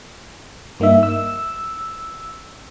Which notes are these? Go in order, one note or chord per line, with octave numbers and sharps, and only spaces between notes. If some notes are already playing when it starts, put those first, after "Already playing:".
G2 A#3 D#4 E5
E6